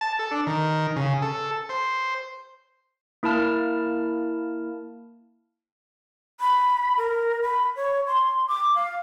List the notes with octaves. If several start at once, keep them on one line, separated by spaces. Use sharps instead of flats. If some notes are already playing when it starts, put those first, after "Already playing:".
A5
A4
D4
D#3
C#3
A4
C5
A#3 E4 A#4 A5 F6
B5
A#4
B5
C#5
C6
D6
F5